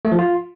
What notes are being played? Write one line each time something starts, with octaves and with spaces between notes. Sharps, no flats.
A3
F3
F4